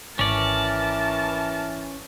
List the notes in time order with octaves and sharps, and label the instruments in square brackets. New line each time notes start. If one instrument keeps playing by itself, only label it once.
[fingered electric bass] G#1 [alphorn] E3 [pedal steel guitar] C#4 D5 [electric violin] A#4 A5